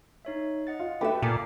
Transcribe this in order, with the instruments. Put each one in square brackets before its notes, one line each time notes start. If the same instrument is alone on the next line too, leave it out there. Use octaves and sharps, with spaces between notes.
[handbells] D#4 C#5 E5
D#5 F#5 A6
[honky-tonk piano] F4
[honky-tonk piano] A3 F#4 B4 [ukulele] G4 E5
[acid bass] A#2 [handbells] A#3 D6 C7 [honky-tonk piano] A4 [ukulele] G#5